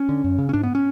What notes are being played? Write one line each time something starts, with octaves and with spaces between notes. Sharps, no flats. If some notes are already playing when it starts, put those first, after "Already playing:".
Already playing: C#4
D3
F#2
C#3
C#4
G#2 D4
B3
C#4